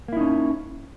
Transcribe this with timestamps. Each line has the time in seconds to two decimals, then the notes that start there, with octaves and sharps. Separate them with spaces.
0.08 A#3
0.13 E4
0.17 D#4
0.21 C#4